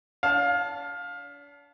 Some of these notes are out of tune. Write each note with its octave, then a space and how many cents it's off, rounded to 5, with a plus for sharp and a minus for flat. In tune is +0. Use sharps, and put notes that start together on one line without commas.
D4 -45 F5 +20 A5 +0